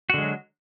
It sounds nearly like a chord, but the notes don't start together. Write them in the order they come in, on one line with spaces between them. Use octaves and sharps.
F#4 D3 G#3 F#3